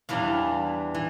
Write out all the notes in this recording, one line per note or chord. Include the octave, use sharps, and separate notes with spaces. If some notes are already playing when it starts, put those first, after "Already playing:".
E2 E3 G3 D4 F5
E3